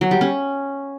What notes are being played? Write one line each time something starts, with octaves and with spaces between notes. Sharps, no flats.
F#3
G3
C#4